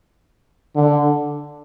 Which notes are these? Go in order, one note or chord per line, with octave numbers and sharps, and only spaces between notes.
D3